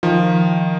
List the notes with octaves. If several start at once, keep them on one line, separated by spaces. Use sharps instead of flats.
D#3 F3